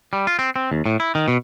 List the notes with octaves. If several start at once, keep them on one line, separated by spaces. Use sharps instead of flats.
G3
F4
C4
C4
D#2
A2
E4
D#3
B2